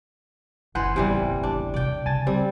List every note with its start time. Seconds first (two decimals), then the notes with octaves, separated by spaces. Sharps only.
0.75 F#1 E3 B4 C5 F#5 G#5
0.96 A1 E2 C3 E3 G3
1.43 D4
1.74 C3 D5 G5
2.06 C#3 B3 G#5 A5 A6
2.27 G3 C4